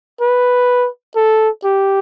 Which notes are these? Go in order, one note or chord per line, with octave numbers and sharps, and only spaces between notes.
B4
A4
G4